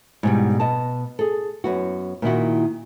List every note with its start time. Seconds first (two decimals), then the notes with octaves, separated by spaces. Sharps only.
0.23 G#2 B2 G3
0.60 B2 D#5 A5
1.19 G#4 A4
1.64 F#2 B3 F#4
2.22 A#2 D#3 E4 F#4